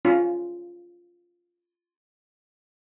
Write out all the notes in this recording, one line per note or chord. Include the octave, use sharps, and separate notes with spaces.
C#4 F4